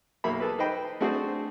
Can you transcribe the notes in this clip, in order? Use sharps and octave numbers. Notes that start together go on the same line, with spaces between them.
B1 A#3 A#4 E5 B5
G#4 A4 B4
D#4 B4 C5 D#5 G5 B5
A3 C4 D4 F#4 G#4 C5